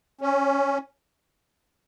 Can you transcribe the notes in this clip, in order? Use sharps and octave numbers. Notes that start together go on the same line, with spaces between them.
C#4